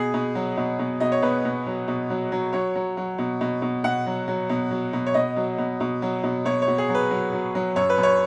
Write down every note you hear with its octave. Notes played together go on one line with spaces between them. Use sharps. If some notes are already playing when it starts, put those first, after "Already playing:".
Already playing: B2 G#4
B2
F#3
B2
B2
B2 D#5
C#5
B2 B4
B2
F#3
B2
F#3
F#3
F#3 C#5
F#3
F#3
B2
B2
B2
B2 F#5
F#3
F#3
B2
F#3
B2
C#5
B2 D#5
F#3
B2
B2
F#3
B2
B2 C#5
C#5
B2
G#4
F#3
B4
F#3
F#3
F#3
F#2 C#5
B4
F#2
C#5